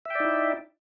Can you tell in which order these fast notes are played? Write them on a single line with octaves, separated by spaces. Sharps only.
E5 G5 D5 D#4 E4